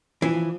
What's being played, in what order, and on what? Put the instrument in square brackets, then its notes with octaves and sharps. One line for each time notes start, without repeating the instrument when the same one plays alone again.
[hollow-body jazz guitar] E3 [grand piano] F3